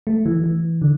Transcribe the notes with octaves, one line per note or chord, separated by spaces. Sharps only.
A3
E3
E3
D3